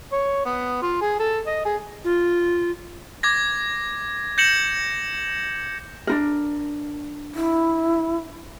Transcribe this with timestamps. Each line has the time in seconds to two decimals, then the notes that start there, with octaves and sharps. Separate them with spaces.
0.12 C#5
0.45 B3
0.82 F4
1.01 G#4
1.20 A4
1.47 D#5
1.65 G#4
2.04 F4
3.23 D6 G#6 A#6
4.38 G6 A#6 C#7 E7 F#7
6.07 D4 D#4 A#4
7.35 E4